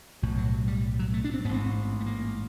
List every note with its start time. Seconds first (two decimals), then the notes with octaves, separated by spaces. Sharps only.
0.22 B1 A2 F3
0.38 F#3
0.54 F#3
0.68 G3
0.99 F#3
1.14 A3
1.24 D4
1.34 C4
1.44 G#2 B3
1.49 A1
1.54 C4
2.00 A3
2.06 A#3